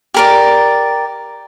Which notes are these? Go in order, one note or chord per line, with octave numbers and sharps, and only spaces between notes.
G4 A#4 D5